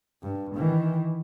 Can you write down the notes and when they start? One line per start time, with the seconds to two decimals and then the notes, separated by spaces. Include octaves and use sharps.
0.22 G2
0.56 D#3 E3